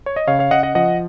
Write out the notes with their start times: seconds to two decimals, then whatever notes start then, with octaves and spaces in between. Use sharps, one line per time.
0.06 C#5
0.16 D#5
0.27 C#3 C#5 F5
0.39 C#5 F5
0.51 C#3 D#5 F#5
0.63 D#5 F#5
0.75 F3 D#5 F#5